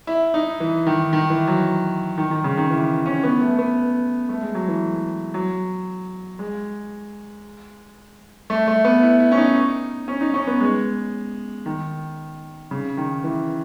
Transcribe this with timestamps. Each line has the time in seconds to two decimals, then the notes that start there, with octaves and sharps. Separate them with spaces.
0.07 E4
0.34 D#4
0.60 E3
0.86 D#3
1.13 D#3
1.30 E3
1.48 F#3
2.18 D#3
2.31 D#3
2.44 C#3
2.58 D#3
2.70 E3
3.06 C#4
3.24 B3
3.41 A3
3.59 B3
4.29 A3
4.42 G#3
4.55 F#3
4.68 E3
5.34 F#3
6.39 G#3
8.50 A3
8.68 A3
8.85 B3
9.03 E4
9.20 E4
9.32 C#4
9.37 D#4
10.08 C#4
10.21 D#4
10.34 C#4
10.47 B3
10.60 G#3
11.66 D#3
12.71 C#3
12.97 D#3
13.24 E3